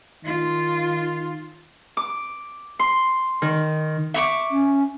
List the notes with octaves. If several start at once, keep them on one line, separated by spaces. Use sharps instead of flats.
D#3 F4
D6
C6
D#3
E5 C#6 D6
C#4